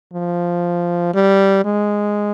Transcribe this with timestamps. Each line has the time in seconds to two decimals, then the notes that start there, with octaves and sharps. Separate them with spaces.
0.14 F3
1.14 G3
1.65 G#3